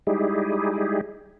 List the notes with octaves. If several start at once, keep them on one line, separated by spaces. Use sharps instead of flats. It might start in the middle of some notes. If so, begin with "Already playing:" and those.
G3 G#3 D#4 E4 G4 G#4